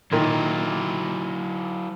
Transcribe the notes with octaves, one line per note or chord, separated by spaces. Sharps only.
A#2 D#3 F#3 E4